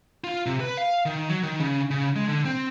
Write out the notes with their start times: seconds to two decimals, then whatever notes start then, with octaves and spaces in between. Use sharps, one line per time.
0.24 F4
0.46 C3
0.60 B4
0.77 F5
1.06 D#3
1.29 F#3
1.43 D#3
1.60 C#3
1.90 C#3
2.16 G#3
2.28 D3
2.45 C4